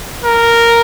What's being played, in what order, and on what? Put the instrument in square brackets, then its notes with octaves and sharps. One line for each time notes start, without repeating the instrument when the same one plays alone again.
[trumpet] A#4